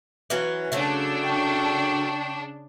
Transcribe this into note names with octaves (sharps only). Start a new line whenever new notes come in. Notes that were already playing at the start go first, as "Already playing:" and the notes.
E3 F#3 C#4
C#3 F#3 A3 D4
G5 C#6